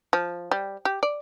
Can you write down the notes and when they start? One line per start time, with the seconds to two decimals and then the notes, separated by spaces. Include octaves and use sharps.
0.13 F3
0.51 G3
0.85 G4
1.03 D5